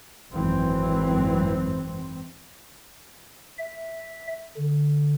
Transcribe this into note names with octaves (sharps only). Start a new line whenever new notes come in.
G#1 F#2 E3 C4
E5
D3